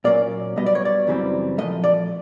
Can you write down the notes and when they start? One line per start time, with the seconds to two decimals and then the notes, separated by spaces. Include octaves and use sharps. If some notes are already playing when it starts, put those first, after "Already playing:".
0.04 A#2 F#3 A#3 C#4 D5
0.56 B2 G3 B3 D#5
0.66 D5
0.75 C#5
0.85 D5
1.07 F#2 C#3 E3 G3 C4
1.58 A#2 F3 A3 D#5
1.84 D5